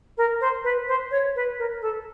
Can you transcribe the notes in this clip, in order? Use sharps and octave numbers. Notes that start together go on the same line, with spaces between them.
A#4
C5
B4
C5
C#5
B4
A#4
A4